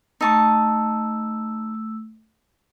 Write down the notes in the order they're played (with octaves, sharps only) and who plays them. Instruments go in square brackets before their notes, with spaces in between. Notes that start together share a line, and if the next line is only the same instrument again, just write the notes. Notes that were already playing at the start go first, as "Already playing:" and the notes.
[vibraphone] A3 E6 [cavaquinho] D#4 A5 C#6